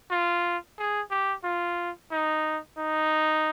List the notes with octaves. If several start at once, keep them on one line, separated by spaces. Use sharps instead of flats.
F4
G#4
G4
F4
D#4
D#4